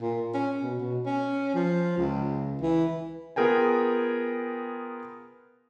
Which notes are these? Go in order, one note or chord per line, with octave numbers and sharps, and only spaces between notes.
A#2
C#4
B2
B2
C#4
F3
C#2
E3
B3 F4 G#4 A#4 G5 G#5